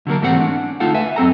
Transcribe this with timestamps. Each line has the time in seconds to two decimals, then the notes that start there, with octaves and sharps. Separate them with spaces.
0.07 D3 F#3 A#3 A#4
0.21 G#2 E3 G3 A3 C4 F#5
0.40 C#4 D4
0.80 D2 A3 D#4 F4 A4 F#5
0.94 B4 E5 G#5
1.16 F#2 C4 A4 A#5